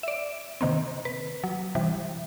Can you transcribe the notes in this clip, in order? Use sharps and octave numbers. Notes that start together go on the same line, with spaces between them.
D5 E5
C3 D#3 A#3 C4
B4
F#3
C3 E3 G3